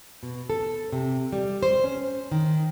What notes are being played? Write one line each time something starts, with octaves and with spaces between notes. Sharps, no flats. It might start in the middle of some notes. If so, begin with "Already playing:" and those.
B2
A4
C3
G3
C5
C#4
D#3